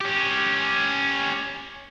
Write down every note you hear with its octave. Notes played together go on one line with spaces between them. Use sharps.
C#4 G4